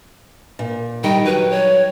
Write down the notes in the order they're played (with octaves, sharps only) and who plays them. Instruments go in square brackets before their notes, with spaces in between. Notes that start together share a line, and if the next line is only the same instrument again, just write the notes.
[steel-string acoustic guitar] A#2
[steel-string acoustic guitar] D#3 G3 A#4 [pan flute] G5
[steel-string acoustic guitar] F#3 [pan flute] B4
[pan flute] C#5